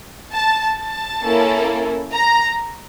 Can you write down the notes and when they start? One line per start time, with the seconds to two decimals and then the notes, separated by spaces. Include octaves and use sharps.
0.34 A5
0.79 A5
1.24 A#3 C#4 E4 A4
2.14 A#5